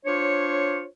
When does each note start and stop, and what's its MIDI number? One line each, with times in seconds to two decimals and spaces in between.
0.05 0.85 62
0.05 0.85 65
0.05 0.85 72
0.05 0.85 73